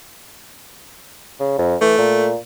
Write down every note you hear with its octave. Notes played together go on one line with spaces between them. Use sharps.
C#3
F2
E3 A3
A#2